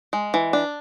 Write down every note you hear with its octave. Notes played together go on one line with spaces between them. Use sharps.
G#3
E3
D4